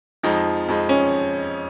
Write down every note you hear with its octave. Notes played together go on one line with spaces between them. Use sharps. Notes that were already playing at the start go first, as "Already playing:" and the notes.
F2 F3 G#3 D#4
F2 F3 G#3
C#4